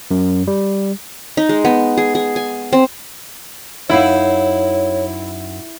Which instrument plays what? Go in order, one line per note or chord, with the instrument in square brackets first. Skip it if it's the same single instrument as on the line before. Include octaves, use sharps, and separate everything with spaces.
[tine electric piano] F#2
G3
[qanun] D#4
G#3
B3
G#4
G#4
G#5
C4
[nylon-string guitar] F#2 D#4 F5 [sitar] E4 [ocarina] C#5